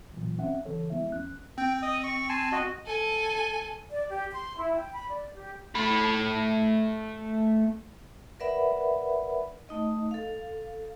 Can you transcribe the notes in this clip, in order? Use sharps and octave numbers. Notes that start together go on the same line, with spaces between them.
A#2 C#3 E3 F#3
C4 C#4 E5 F#5
C#3 E3 A4 C#5
F3 G#3 B3 E4 E5
G#1 E2 C#4 F#6
C4 G5
D#5 D#6
C#6
G#5 A5 C6
F#4 D#5
A4 G#5
D5
G4
C6
E4
G5
B5
D5
G4
A3 B5
A#4 B4 D5 E5 F#5 B5
A3 D#4 D#5
A4 F5